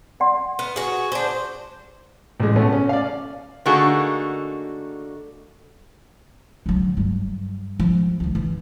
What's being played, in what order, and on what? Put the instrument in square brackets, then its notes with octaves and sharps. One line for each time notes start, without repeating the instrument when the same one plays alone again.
[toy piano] D5 F#5 C6
[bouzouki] B3 [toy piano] B4
[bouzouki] F#4 G#4
D4 C5
[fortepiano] A1 G#3
B2 A3 B3 C#4
C#4
D5 F5
[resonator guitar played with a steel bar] D3 A3 A#3 D#4 F#4 G#4
[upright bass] D3 F#3
G2 F#3
F3 G#3
D2 D#3
E3